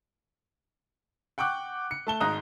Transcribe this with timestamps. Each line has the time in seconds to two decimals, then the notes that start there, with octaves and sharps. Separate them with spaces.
1.38 F#5 G5 C#6 D6 F#6
1.91 C#7
2.07 A3 A5 G7
2.20 G#1 G#2 D#5 A#5 D#6 F#6